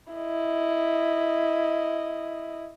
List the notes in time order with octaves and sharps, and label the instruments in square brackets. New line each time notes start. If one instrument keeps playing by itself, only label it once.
[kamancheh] E4 D#5